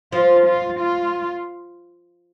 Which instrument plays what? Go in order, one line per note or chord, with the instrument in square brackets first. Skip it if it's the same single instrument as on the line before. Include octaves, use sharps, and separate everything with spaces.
[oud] F3 [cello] F4
[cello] F4
F4